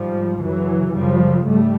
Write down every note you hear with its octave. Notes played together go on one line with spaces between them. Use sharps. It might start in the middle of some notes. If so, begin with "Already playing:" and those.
Already playing: G#2 F3 G3
F#2 C#3 E3 F#3
F#2 C#3 F3 G3
G#2 G3 A3